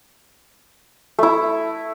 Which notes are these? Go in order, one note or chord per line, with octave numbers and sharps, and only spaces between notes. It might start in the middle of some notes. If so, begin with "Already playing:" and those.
A3 E4